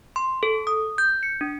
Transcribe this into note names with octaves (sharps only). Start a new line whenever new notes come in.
C6
A4
D#6
G6
C#7
D4